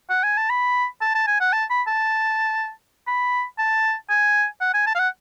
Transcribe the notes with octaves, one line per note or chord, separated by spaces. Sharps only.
F#5
G#5
A5
B5
A5
A5
G#5
F#5
A5
B5
A5
B5
A5
G#5
F#5
G#5
A5
F5
F#5